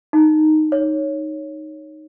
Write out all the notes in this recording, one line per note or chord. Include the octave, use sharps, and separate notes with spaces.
D#4
C#5